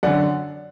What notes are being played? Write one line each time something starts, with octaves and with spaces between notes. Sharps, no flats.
F#2 D3 D5 F#5